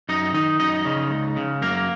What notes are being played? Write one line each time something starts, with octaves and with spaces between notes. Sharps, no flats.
F#2 D#4 D#5
D#3 D#4 D#5
F#2 D#4 D#5
C#3
C#2
C#3
F#2 A#3 A#4